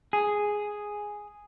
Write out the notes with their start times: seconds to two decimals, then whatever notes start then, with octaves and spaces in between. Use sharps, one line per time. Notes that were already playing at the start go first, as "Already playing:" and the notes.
0.13 G#4